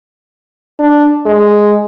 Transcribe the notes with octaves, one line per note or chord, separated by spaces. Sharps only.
D4
G#3